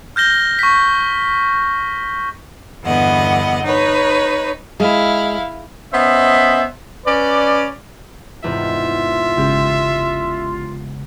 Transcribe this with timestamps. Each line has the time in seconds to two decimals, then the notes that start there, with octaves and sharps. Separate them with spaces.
0.16 F6 G6 A#6 G7
0.59 C#6 B6
2.83 E2 G2 D3 B3 D#5 F#5
3.63 D#4 B4 C#5
4.80 G#3 E4 F5
5.93 B3 C#4 C5 D#5 E5
7.06 C#4 B4 D5
8.44 E2 G#2 C3 F4 E5
9.37 G#1 C#3 G#3 G4